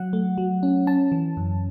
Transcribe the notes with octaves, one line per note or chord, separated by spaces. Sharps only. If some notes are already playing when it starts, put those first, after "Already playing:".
Already playing: F#3 F#5
A3
F#3
C#4
C#4 A5
E3
F#2